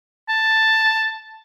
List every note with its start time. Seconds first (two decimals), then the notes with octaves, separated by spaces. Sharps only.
0.29 A5